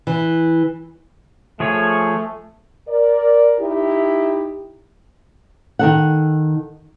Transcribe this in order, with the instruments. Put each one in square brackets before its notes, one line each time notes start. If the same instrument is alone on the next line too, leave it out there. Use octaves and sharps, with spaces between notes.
[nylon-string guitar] E3
[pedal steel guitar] F3 G#4 C#5 [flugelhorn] A3
[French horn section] A#4 D5
D#4 E4 G4
[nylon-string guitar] D#3 A4 F#5